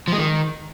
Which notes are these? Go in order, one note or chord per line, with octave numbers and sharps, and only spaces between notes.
F3
G#3
D#3